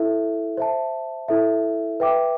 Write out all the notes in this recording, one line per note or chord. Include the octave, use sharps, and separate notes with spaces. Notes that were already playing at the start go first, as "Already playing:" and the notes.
Already playing: E4 A4 E5
C5 E5 A5
E4 A4 E5
B4 E5 G5 D6